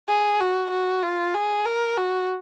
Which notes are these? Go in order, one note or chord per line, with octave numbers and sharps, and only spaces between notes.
G#4
F#4
F#4
F4
G#4
A#4
F#4